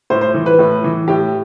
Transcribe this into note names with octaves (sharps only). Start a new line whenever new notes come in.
A2 C5
C5
E3
B4
A2
E3
A2 G4